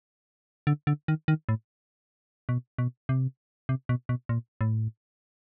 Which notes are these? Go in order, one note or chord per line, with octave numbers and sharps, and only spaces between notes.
D3
D3
D#3
D#3
A2
B2
B2
C3
C3
B2
B2
A#2
A2